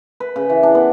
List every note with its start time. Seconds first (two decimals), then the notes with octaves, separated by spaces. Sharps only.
0.20 B4
0.36 C#3
0.50 E3
0.63 D4
0.75 B3